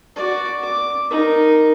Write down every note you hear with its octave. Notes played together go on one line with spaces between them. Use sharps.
F#4 D5
D6
D#4 A#4